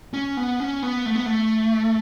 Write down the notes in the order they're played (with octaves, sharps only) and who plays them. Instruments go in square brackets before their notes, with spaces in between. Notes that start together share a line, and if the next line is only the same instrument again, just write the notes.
[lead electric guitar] C#4
B3
C#4
B3
A3
B3
A3